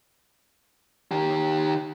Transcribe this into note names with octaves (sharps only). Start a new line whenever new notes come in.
D#3 G4